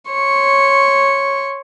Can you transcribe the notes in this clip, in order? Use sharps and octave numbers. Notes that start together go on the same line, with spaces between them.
C#5 C6 C#6